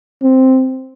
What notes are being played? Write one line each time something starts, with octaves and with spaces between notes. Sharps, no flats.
C4